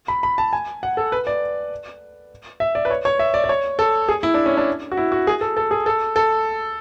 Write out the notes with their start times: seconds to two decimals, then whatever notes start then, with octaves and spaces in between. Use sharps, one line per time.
0.08 B5
0.23 B5
0.38 A5
0.53 G#5
0.83 F#5
0.97 A4
1.12 B4
1.27 D5
2.60 E5
2.75 D5
2.85 B4
2.91 C#5
3.05 C#5
3.19 E5
3.34 D5
3.44 D5
3.49 C#5
3.79 A4
4.09 G#4
4.23 E4
4.34 D4
4.46 C#4
4.57 D4
4.92 F#4
4.97 E4
5.12 F#4
5.27 G#4
5.41 A4
5.57 A4
5.71 G#4
5.86 A4
6.16 A4